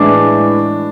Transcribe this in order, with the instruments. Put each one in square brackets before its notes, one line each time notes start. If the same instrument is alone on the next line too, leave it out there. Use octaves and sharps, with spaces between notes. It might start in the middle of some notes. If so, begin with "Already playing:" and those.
Already playing: [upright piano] A2 E3 G#3 D4